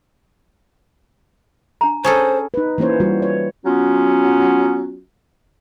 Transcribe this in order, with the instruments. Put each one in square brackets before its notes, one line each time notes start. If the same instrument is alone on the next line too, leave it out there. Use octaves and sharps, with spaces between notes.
[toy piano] D4 A#5
[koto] C#4 G#4 A4 [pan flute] C5
[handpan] D#4 B4
E3 A#3 C#4 C5 C#5
E3 G3 F4 F#4
C#5
[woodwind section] F#3 B3 C#4 F4